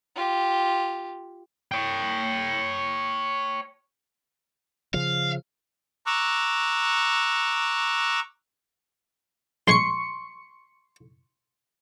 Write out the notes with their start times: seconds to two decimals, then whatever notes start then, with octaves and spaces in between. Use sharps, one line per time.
0.16 F4 G4
1.72 C#5 G5
4.94 C#3 F3 F5
6.06 A#5 C#6 D6 E6 F#6
9.67 A#1 G#3 G#5 C6 C#6 C#7